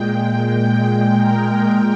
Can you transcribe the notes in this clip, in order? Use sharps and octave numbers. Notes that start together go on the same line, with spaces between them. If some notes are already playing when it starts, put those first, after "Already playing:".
Already playing: A#2 G#3 G5
A#2 G#3 G5
A#4